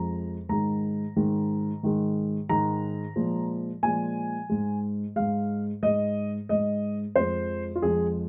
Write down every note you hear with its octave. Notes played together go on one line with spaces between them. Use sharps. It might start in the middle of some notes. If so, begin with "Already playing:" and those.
Already playing: F2 F3 G#3 A#5
G#2 D#3 G#3 A#5
G#2 D#3 G#3
G#2 D#3 G#3
G#2 D#3 G#3 A#5
A#2 F3 G#3
A#2 F3 G#3 G#5
G#2 G#3
G#2 G#3 F5
G#2 G#3 D#5
G#2 G#3 D#5
F2 F3 G#3 C5
F4
F2 F3 G#3 G#4